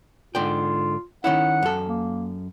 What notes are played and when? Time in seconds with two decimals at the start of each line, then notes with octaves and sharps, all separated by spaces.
0.35 G#2 D3 F4 G5
1.24 D#3 C#4 E4 F#5
1.63 F#2 A4
1.88 A#3